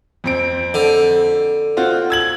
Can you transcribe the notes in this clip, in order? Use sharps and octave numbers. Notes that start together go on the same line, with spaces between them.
F2 C4 D7
D3
C4 F4 F#4
E6 G#6 F#7